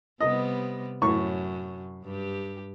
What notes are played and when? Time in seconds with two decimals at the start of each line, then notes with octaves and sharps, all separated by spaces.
0.21 C3 G3 B3 D#5
1.02 F#2 A2 C#6
2.04 G2 G4